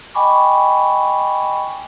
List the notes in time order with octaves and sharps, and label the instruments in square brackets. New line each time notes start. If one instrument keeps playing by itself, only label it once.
[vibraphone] D#5 G5 G#5 B5 C#6 D6